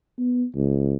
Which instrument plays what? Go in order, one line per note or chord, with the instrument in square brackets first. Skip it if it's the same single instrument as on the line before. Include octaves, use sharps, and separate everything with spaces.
[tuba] B3
C#2